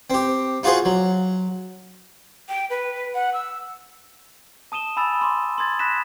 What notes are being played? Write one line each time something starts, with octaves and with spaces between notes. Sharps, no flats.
C4 G4
D#4 F4 F#4 G#4 C5
F#3
G5
B4
F#5
E6
A5 D#6 D#7 E7 G7
G#5 B5 D#6 E6 A6 E7
C6 D6
C6 D#6 G#6 A6
B5 D#6 F#6 A#6 B6 E7